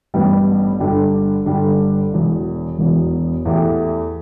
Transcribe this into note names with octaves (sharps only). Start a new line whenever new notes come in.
A1 G2 G3 B3
G1 G2 D3 G3 D4
G1 G2 D3 G3 D4
E1 E2 B2
E1 E2 B2
E2 E3 A3 G4